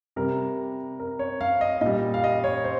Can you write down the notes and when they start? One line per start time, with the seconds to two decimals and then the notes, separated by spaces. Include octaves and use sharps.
0.16 C3 G3 A#4
1.00 A#4
1.19 C#5
1.41 F5
1.61 D#5
1.81 A#2 D#5
1.86 G3
2.14 F5
2.24 D#5
2.44 C#5
2.64 C5